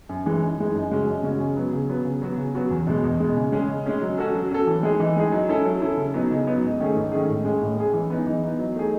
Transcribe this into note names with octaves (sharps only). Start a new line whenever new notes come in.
F#2
E3 G#3 D#4
F#2
E3 G#3 D#4
F#2
C#3 G#3 C#4 F#4
F#2
C#3 G#3 C#4 F#4
C#3
F#3 B3
C#3
F#3 B3
C#3
F#3 B3 F#4
C#3
F#3 B3 F#4
E2
B2 G#3
E2
B2 G#3
C#3
G#3 C#4 G#4
C#3
G#3 C#4 G#4
F#3
C#4 F#4 A4
F#3
C#4 F#4 A4
E3
G#3 D#4 G#4
E3
G#3 D#4 G#4
F#3
C#4 E4 A4
F#3
C#4 E4 A4
C#3
F#3 B3 D#4
C#3
F#3 B3 D#4
G#2
D#3 A3 C#4 G#4
G#2
D#3 A3 C#4 G#4
A2
G#3 C#4 G#4
A2
G#3 C#4 G#4
E3
B3 D#4
E3
B3 D#4
F#3
A3 D#4 G#4